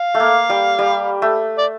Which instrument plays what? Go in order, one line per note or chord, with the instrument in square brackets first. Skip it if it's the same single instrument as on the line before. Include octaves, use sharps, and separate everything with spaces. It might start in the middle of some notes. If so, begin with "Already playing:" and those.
Already playing: [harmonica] F5
[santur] A3
A#3
G3
G3
A3
[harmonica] D5